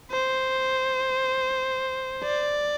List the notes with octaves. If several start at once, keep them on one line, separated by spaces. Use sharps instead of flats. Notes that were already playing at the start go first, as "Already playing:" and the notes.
C5
D5